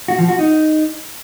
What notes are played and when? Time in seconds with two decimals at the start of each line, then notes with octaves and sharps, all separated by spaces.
0.08 F#4
0.18 F3
0.28 F#4
0.39 D#4